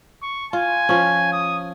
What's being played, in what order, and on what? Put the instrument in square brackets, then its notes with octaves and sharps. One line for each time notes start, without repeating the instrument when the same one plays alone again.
[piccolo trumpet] C#6
[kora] F4 [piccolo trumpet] G#5
[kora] F3 C#4
[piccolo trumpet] D#6